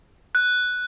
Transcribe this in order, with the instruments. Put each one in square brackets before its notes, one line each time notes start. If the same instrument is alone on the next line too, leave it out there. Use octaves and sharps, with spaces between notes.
[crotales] F#6